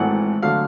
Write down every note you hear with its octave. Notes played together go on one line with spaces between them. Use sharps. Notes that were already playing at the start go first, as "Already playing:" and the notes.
Already playing: G#1 G#2 E3 A3 F#5
D3 F#3 A3 F5